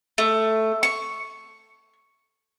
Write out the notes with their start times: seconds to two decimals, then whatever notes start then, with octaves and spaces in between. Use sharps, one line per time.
0.18 A3
0.83 C#6